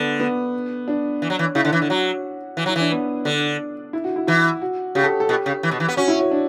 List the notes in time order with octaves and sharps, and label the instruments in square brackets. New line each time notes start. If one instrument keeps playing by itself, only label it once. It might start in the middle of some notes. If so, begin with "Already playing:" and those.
Already playing: [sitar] D3 [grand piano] B3
[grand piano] B3
D4
[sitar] E3
F#3
E3
[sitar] C#3 [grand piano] E4
[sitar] D3
E3
D3
[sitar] F#3 [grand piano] F#4
[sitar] E3
[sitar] F#3 [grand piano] E4
[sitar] E3 [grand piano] D4
[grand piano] B3
[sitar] D3 [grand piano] D4
[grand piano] E4
F#4
E4
[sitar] E3 [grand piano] E4
[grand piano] F#4
[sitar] C#3 [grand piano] G4
[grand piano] A4
A4
[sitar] B2 [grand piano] G4
[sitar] C#3
E3
B2
E3
B3
[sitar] C#4 [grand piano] F#4
[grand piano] E4
F#4
D4